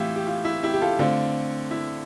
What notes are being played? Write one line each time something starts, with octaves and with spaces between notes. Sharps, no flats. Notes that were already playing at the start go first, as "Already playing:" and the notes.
Already playing: A2 E3 E4 F4 G4
G4
F4
E4
E4 G4
G4
F4 A4
D3 A3 C4 F4
E4